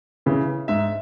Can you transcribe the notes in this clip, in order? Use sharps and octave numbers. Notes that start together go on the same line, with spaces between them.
C#3 E3
G#2 E5